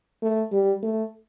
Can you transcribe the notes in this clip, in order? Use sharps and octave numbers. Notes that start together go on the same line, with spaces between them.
A3
G3
A3